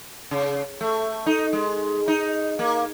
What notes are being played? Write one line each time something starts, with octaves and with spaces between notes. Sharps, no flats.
C#3
A3
D#4
G#3
D#4
A#3